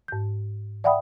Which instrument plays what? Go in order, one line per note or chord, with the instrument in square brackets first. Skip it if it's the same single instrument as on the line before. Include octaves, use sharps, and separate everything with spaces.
[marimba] G#2 G6
D5 E5 F#5 G5 B5 D#6